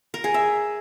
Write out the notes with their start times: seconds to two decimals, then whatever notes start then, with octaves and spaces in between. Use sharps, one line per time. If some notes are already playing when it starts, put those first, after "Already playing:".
0.14 A#4
0.24 G#4
0.34 E5